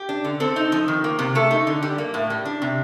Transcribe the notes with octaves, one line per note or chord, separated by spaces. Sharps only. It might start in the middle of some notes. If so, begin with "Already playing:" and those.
Already playing: G4
D4
D3
C4 A4
D#4
F3
D#3
A#3
C3
A3 A4
D#4
D3
G3
A#3
A2
G3
D4
C3